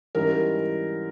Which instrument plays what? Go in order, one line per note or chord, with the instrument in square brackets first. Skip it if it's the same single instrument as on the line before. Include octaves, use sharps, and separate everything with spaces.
[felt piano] G#2 E3 G3 C#4 A#4